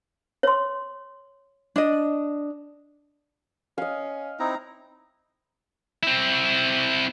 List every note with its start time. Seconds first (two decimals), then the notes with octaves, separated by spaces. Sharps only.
0.43 C#5 C6
1.76 D4 D#5
3.78 C#4 D#5 F5
4.40 C4 D#4 E4 A#5
6.03 C4 E4